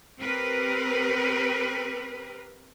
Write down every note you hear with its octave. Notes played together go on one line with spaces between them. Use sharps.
C4 G4 A#4 B4